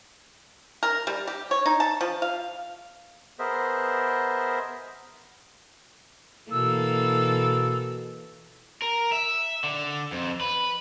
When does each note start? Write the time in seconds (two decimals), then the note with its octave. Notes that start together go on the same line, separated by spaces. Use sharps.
0.83 A#4
1.07 G3
1.28 G4
1.51 C#5
1.66 D#4
1.80 A5
2.01 F3
2.22 F5
3.39 B3 G#4 A#4 C5 D#5 E5
6.51 B2 E3 A#3 A4 E6
8.82 A#4
9.12 E5
9.64 D3
10.12 F2
10.41 B4